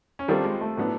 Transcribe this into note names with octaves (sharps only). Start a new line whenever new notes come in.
C#4
D#3 G3 C4 D4 F4 A4
G#3
A3
A2 F#3 B3 D4